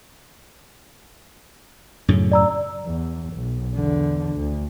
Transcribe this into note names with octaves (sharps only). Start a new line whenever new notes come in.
F#2 A2 C#3
D5 A#5 E6
E2
B1
E2 D3
D2